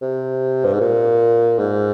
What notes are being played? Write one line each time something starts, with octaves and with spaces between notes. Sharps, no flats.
C3
G2
G#2
A#2
G#2